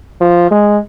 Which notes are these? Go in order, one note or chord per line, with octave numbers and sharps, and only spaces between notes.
F3
G#3